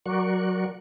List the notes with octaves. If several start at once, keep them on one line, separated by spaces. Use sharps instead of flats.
F#3 A#4 D5 F#5 C#6